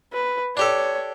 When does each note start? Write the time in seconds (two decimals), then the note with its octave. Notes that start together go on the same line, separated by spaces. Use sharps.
0.13 B4
0.57 D4 G4 A4 C#5